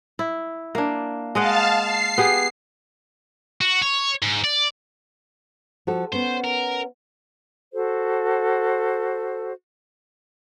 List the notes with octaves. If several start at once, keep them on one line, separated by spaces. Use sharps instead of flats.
E4
A#3 D4
G#3 D#5 F5 F#5 A5
C7
B3 G4 G#4
F#4
C#5
G#2
D5
F3 F#4 A4
B3 C#4 C5
A#4
F#4 A4 C5